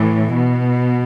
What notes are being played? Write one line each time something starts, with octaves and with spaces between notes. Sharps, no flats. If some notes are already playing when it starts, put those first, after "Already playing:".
Already playing: A2 E3
B2